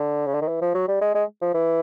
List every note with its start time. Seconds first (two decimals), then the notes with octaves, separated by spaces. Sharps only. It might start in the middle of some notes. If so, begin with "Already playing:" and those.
Already playing: D3
0.27 C#3
0.34 D3
0.41 D#3
0.48 E3
0.62 F3
0.74 F#3
0.88 G3
1.01 G#3
1.15 G#3
1.41 F3
1.54 E3